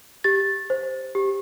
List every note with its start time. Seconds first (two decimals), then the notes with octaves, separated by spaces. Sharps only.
0.24 G4 A6
0.70 C5
1.15 G4